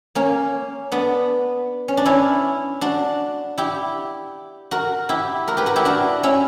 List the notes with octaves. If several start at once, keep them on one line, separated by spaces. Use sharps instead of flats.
A#3 C#4
B3 D4
C#4
D4
C#4 E4
D4 F#4
E4 G4
F#4 A#4
E4 G4
F#4 A#4
G4 B4
F#4 A#4
E4 G4
D4 F#4
C#4 E4